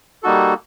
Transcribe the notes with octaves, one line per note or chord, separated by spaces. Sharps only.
G3 A#3 D#4 F#4 A4